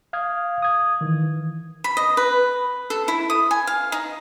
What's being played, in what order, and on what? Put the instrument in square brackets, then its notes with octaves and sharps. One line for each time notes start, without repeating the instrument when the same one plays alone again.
[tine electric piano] F5 D#6 F6 G#6
D#6 G#6
D#3 E3
[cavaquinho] B5
D#5
B4
A4
E4
D#6
G#5
F5
D#4